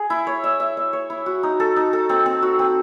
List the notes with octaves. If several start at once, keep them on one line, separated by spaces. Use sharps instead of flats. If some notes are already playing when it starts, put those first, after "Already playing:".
Already playing: G#4
E4
C#5
E5
E5
E5
C#5
E4
F#4
D#4
A4
D#4
A4
C4
C4
F#4
C4